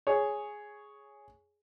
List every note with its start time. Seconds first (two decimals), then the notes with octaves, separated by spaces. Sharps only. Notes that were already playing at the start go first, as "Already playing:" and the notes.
0.07 G#4 C#5